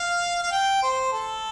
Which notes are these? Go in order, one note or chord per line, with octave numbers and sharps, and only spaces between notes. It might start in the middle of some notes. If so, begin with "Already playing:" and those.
Already playing: F5
F5
G5
C5
A4